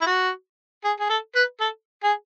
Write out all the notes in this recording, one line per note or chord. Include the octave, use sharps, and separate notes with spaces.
E4
F#4
G#4
G#4
A4
B4
A4
G#4